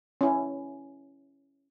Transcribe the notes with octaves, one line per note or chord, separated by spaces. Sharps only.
C#4 E4